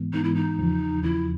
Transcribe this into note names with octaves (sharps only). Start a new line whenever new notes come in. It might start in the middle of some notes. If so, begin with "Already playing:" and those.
Already playing: G#2 E3 G#3 B3
G#2 E3 G#3 B3 D#4
E4
D#4
E2 C#3 F3
E2 C#3 F3 E4